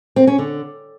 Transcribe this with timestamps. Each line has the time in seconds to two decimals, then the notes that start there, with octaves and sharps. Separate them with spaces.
0.16 C4
0.27 C#4
0.38 D3